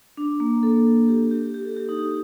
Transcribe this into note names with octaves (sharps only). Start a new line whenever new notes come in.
D4
A#3
A4
G4
G4
G4
A4
G4
D#4
G4